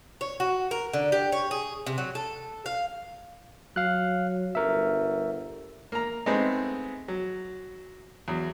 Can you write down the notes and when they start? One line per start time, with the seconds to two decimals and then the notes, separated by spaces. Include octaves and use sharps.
0.21 C#5
0.40 F#4
0.71 A#4
0.93 D3
1.12 G4
1.32 C#5
1.51 G#4
1.87 C3
1.98 F#3
2.15 A4
2.66 F5
3.76 F#3 F5 F#6
4.55 G1 A#4 E5
5.92 A#3 A#5
6.26 G#3 A3 B3 C4 D#4 G#4
7.08 F#3
8.28 E2 F#3